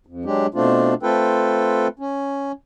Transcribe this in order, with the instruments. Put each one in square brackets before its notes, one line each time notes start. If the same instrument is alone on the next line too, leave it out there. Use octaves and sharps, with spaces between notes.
[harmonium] F2
F#3 G#3 D4 G4
B2 A3 C4 D4 F4
A3 C4 F4 A4 B4 G5
C#4